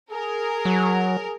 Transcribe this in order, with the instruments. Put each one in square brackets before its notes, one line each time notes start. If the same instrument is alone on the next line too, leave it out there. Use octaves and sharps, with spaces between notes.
[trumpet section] G#4 [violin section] A#4
[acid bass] F#3